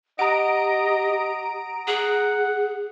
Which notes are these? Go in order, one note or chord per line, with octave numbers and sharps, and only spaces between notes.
G4 D#5 F#5 A#5 D#6 D7
G#4 F#5